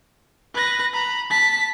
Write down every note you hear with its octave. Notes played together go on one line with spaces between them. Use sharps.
B4 A#6
A#5 B5
A5 B6